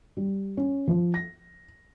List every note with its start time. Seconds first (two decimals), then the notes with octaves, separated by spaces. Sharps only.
0.17 G3
0.57 C#4
0.88 F3
1.14 A#6